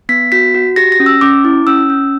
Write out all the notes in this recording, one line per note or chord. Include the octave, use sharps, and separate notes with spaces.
B3 B6
F#4 B6
F#4
G4 A#6
A#6
C#4
E6
C#4 D6
E4
C#4 E6
C#4